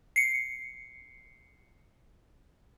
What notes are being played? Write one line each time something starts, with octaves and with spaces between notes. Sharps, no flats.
C7 C#7